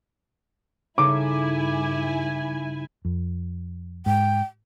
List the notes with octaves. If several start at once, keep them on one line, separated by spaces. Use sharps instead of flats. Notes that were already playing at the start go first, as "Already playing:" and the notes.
G2 C#3 D#4 E4 A4 G#5 D6
F2
G#2 G5